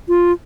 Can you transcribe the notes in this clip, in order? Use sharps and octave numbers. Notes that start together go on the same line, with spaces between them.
F4